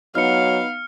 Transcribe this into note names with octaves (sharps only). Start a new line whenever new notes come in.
F#3 B3 D#4 F5 F6 C#7